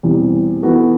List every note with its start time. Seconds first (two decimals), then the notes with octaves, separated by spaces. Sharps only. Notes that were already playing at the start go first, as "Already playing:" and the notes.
0.03 E2 B2 G3 C4
0.63 E3 B3 F#4 A4